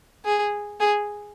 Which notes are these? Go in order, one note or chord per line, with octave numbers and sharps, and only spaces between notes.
G#4
G#4